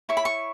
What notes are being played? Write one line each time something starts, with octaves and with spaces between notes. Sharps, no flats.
E4 C#5 C#6
B5
C#6